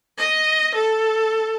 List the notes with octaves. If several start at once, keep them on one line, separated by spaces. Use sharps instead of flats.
D#5
A4